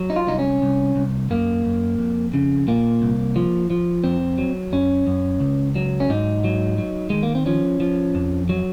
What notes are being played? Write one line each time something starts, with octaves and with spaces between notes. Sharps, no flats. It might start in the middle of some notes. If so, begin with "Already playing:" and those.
Already playing: F#3
D#4
F4
C2 D#4
C#4
C2
C2
F#2 A#3
F#2
F2
C#3
A#2 A#3
C2
F3
F3
F2 C4
F#3
F#2 C#4
F#2
C#2
F#3
C#4
G#2 D#4
F#3
F#3
D#3 G#3
A#3
C4
F3 C#4
F3
F2
F#3